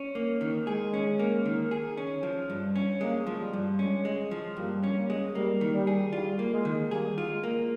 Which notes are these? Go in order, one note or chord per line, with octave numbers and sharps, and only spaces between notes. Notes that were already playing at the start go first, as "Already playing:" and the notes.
Already playing: C#4
A#3
D#3
G#3 G#4
C#4
A#3
D#3
G#4
C#4
F3
G2
C#4
G3 G#3 A#3
F3
G3
G2
G#3 C#4
G#3
F3
G2 G3 A#3
C#4
G3 A#3
G#3
G3 A#3
D#3
G3
G#4
G3 F4
A#3
G#3
D#3
G3 A#3 G#4
F4
G#3
A#3